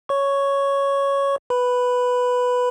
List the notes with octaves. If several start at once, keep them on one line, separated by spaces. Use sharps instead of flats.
C#5 C#6
B4 B5